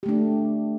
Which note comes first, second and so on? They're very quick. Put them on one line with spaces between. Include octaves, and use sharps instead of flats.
G4 A3 D4